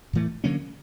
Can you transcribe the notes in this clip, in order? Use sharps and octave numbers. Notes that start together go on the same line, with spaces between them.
A2 E3 A3
D3 F#3 A#3 C#4